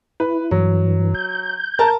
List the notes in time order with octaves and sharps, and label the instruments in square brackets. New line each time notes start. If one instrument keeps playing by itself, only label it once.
[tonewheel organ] E4 [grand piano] B4
[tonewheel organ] G2 E3 [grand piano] F#3
[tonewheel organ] G6
[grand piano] A#4 A5